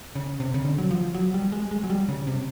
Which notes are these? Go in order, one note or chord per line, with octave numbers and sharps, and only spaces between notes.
C#3
C3
C#3
D3
F#3
F3
F#3
G3
G#3
G#3
F#3
G3
C#3
C3